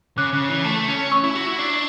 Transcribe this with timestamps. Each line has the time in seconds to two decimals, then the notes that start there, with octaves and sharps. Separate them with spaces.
0.17 C#3 D6 F#6
0.33 C#3
0.49 E3
0.64 A3
0.88 C#4
1.11 C#6 E6
1.24 E4
1.35 F#4
1.47 E4
1.59 D4